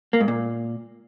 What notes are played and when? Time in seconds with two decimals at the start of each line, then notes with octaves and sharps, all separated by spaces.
0.13 A#3
0.21 G#2
0.28 A#2